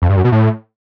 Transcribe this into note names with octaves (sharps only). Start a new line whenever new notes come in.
F2
G2
F#2
B2
A2